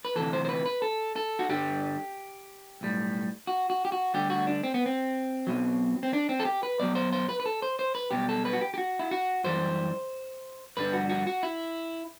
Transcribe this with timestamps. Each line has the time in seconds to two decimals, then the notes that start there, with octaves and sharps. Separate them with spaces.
0.05 B4
0.16 D2 C3 E3 A4
0.33 C5
0.45 C5
0.49 B4
0.66 B4
0.82 A4
1.16 A4
1.39 F#4
1.49 G2 D3 G3 G4
2.81 B1 A2 G3
3.47 F#4
3.70 F#4
3.85 G4
3.92 F#4
4.14 D2 D3 G3 G4
4.30 F#4
4.47 D4
4.63 C4
4.74 B3
4.86 C4
5.47 B1 B2 F#3
6.03 C4
6.13 D4
6.29 C4
6.40 A4
6.45 G4
6.63 B4
6.80 B1 B2 F#3 D5
6.95 C5
7.13 C5
7.29 B4
7.40 B4
7.46 A4
7.62 C5
7.79 C5
7.95 B4
8.11 B1 B2 G3 G4
8.29 A4
8.45 B4
8.53 F#4
8.61 G4
8.74 G4
8.78 F#4
8.99 E4
9.11 F#4
9.44 F#2 E3 G3 C5
10.77 G2 D3 G3 B4
10.93 F#4
11.09 F#4
11.27 F#4
11.43 E4